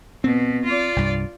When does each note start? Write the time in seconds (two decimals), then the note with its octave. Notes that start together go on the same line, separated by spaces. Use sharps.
0.24 B2 C4
0.65 F4 D5
0.96 C2 G2